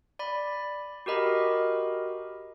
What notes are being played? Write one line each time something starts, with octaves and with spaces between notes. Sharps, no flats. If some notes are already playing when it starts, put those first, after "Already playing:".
D5 B5
F#4 G4 A#4 D#5 B5